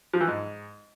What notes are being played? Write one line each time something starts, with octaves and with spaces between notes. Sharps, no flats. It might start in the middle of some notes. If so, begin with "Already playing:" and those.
F3
E3
G#2